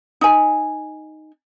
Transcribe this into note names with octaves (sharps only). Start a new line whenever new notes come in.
D#4 G#5